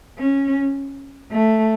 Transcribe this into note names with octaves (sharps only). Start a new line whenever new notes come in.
C#4
A3